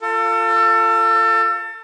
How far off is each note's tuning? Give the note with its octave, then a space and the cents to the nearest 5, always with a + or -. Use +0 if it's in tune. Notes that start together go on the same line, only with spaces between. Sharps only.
F4 -5 A4 +30